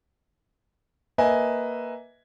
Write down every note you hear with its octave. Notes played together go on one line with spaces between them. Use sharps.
A#3 B4 D#5 E5 G#5